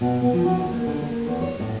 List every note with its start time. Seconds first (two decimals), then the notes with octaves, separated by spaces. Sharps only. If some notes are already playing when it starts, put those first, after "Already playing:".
0.01 B2
0.22 B3
0.33 F3
0.45 F#4
0.59 D#2
0.73 A#3
0.87 D3
1.01 A#3
1.27 E2
1.41 C#5
1.60 A2